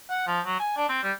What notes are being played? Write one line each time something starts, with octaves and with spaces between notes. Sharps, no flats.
F#5
F3
F#3
G#5
D4
C4
G3